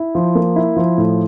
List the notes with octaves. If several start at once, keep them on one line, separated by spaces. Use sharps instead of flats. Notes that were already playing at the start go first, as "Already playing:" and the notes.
Already playing: E4
F3
A#3
E4
F3
A2